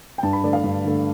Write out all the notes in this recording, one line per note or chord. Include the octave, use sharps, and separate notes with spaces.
G5
G2 A5
B5
D3 A3 D5
F5
G2
D3 A3